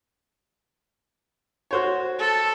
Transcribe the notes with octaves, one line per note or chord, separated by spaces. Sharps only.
F#4 C5 C#5
A4